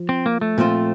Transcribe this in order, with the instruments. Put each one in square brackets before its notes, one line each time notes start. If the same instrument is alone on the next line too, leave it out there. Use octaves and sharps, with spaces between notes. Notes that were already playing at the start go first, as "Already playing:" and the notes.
Already playing: [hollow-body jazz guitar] F3
[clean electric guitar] C4
A#3
A3
[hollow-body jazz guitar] A#2 F3 C4 F4